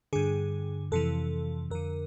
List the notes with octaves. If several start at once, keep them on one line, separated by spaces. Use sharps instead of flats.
G2 D3 G#4
F2 C3 E3 A4
F2 D3 A#4